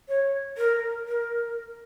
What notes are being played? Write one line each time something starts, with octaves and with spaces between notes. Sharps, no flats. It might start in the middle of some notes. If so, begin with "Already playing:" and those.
C#5
A#4
A#4